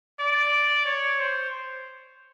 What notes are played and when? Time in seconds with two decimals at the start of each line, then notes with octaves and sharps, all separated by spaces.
0.19 D5
0.86 C#5
1.20 C5